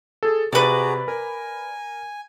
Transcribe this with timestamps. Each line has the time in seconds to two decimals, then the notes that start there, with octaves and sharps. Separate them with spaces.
0.23 G#4 A4
0.53 C3 F#4 G#4 B4 D5 A#5
1.08 A#4 G#5